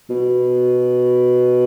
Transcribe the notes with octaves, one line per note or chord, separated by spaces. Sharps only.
B2